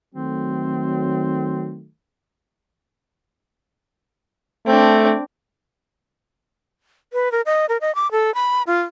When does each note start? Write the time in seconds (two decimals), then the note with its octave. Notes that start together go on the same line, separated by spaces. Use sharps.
0.15 D#3 F#3 A3 C4
4.66 A3 C4 D4
7.13 B4
7.32 A#4
7.46 D#5
7.69 A#4
7.81 D#5
7.95 D6
8.12 A4
8.35 B5
8.67 F4